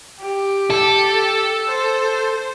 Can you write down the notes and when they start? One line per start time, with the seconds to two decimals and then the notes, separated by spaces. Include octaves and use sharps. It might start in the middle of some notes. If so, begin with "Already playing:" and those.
0.21 G4
0.70 A4
1.67 C5